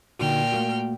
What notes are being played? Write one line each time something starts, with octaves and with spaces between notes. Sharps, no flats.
A#2 D3 D#4 F#4 G5 F6
A3 A#3 F#4